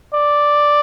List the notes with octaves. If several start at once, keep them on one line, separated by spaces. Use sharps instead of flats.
D5